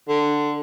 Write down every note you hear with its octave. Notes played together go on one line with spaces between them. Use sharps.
D3